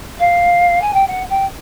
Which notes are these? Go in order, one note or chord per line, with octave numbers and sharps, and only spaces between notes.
F5
G#5
G5
F#5
G5